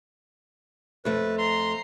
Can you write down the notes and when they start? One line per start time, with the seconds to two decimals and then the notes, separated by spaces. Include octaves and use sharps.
1.05 F2 A3 B4
1.38 A#5 C6 C7